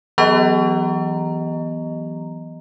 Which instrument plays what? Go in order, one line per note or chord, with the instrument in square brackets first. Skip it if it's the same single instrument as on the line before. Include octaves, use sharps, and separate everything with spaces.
[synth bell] E3 F#3 B3 G4 D#5 A#5